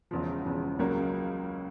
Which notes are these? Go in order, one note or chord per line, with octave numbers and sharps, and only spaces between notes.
E1 E2 C#3 F3
E1 E2 C#3 F3
C#2 C#3 F#3 A#3